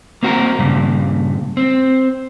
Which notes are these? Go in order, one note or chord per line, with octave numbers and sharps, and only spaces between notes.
A#3 C4 F#4 G#4 A#4
G2 A#2 C#3
C4